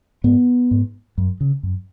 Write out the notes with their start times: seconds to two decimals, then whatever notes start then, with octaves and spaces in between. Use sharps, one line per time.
0.24 G#2 B3
0.71 G#2
1.18 F#2
1.41 C#3
1.63 F#2